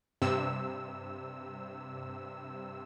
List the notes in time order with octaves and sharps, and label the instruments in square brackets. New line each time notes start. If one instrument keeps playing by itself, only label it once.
[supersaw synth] G2 C3 E6